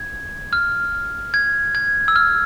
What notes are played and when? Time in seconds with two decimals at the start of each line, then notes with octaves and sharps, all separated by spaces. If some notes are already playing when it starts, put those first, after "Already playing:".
Already playing: G#6
0.53 F6
1.34 G#6
1.75 G#6
2.08 E6
2.16 F6